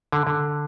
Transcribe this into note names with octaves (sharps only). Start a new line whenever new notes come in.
D3
D3